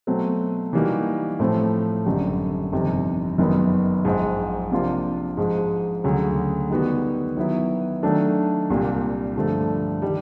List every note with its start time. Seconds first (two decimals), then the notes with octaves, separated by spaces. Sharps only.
0.07 B2 F#3 A3 C4
0.73 E3 G3 A#3 D#4 F#4
1.39 A2 F3 A3 C4
2.06 G#1 F#2 D3 G3
2.73 G1 F2 C3 D#3
3.38 F#1 F#2 D#3 F#3 B3
4.05 A#1 G#2 F3 G#3
4.71 C3 F3 A#3 D4 F4
5.37 G#2 F3 G#3
6.04 D2 C#3 F#3
6.70 D#3 G3 B3 D#4 F#4
7.37 D#3 F#3 B3 E4
8.03 D#3 F#3 A3 D4
8.70 C2 A#2 G3 A#3
9.36 G2 D3 F3 A3
10.02 D#3 G3